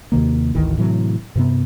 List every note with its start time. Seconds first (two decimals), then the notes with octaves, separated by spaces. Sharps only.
0.12 D#2 C3 D#3 A#3
0.55 G#1 D2 D#3 E3
0.77 A2 C3 E3 F#3
1.35 G2 C3 B3